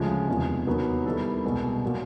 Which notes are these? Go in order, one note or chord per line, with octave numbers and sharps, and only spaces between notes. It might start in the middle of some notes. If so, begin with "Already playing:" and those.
Already playing: D2 C#3 F3 G#3
E2 C3 D#3 G#3
D#2 D#3 F#3 B3
D#3 G3 B3 E4 A4
C2 B2 G#3
A#2 F#3